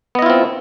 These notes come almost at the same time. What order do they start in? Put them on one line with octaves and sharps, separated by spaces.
B3 D#5 E4 F4 C4